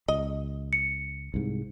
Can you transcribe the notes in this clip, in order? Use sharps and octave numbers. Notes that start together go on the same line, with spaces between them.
C#2 D#5
C#7
C2 G#2